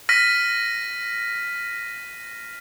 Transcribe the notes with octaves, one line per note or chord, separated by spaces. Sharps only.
F6 A#6 B6 D#7